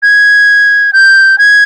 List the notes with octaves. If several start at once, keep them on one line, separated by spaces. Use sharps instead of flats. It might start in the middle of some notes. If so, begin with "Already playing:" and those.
G#6
G6
G#6